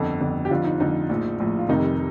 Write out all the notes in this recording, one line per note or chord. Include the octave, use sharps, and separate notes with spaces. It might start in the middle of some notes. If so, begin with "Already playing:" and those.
Already playing: G1 F2 D3 A4
G1 F2 D3
G4
F2 D3 F3 F4
D#4
F2 D3 F3 D#4
A#1 A2 F3
A#1 A2 F3
F4
F1 F2 C3 D#3 D#4